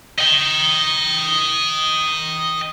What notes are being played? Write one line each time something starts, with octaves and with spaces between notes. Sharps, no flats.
D#5 G5